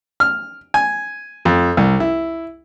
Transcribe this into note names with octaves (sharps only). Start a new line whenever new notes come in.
F6
G#5
F2
C2
E4